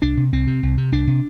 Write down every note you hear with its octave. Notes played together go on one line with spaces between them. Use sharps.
C2 D4
C3
C2 C4
C3
C2
C3
C2 D4
C3